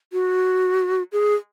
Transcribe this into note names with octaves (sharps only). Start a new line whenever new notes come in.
F#4
G#4